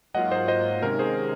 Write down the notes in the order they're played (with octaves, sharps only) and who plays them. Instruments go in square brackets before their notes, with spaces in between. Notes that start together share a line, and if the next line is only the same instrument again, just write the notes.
[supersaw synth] G#2 F#3 A#3 F4 [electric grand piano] D#5 F#5
[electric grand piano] C5 D#5
C5 D#5
[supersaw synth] C3 D#3 G#3 C#4 [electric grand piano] A#4
[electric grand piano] G#4 C5